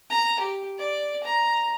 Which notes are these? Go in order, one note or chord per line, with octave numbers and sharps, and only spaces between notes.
A#5
G4
D5
A#5